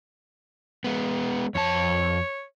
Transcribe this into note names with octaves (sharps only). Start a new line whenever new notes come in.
G#3 B3
F2 C#5 A5